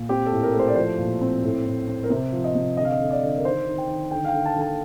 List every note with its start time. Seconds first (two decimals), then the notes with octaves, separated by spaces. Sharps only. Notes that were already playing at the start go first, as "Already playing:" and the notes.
Already playing: A#2
0.09 C4 G4
0.26 A4
0.32 A2
0.43 A#4
0.54 A3
0.59 C5
0.68 D5
0.75 F3 C5
0.98 A#2
1.21 C4
1.43 A2
1.65 A2
1.88 C4
2.04 A#4
2.10 C3 C5
2.33 F3
2.44 D#5
2.55 C3
2.77 D3 D#5
2.85 F5
2.92 D#5
3.00 D3
3.11 D5
3.22 D3
3.38 A#4
3.45 D#3 C5
3.67 D#3
3.78 G5
3.89 D#3
4.11 D3 G5
4.24 F5
4.28 G5
4.33 D3
4.46 A5
4.56 D3
4.62 A5